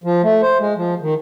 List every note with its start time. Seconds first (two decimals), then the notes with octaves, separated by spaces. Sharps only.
0.04 F3
0.23 A3
0.42 C5
0.59 G#3
0.76 F3
1.01 D#3